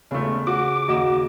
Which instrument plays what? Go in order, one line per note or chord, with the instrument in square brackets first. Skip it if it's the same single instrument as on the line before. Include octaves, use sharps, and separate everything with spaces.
[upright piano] E1 A3 [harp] C#3
[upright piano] F#4 [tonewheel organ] D6
[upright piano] D#2 D#5 E7 [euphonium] F#4